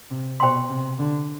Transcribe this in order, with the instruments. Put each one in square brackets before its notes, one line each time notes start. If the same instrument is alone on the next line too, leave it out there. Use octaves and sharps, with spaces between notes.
[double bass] C3
[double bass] B2 [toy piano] C5 G5 C6
[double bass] C3
D3